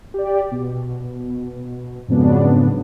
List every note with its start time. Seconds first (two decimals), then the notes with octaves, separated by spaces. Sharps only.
0.14 G4 D5
0.52 B2
2.08 F2 G#2 C#3 F#3 B3 D4